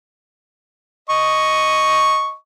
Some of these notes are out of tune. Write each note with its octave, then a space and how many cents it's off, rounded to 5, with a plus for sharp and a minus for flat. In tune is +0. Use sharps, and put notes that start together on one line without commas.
D#5 +0 C#6 +0